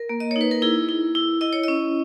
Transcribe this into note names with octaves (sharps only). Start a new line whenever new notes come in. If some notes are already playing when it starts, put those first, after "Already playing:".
Already playing: A#4
A#3
D#5
D#4 C#5
B4
A#4
E4 G#4
E4
E4
E4 D#5
C#5
C#4 D#5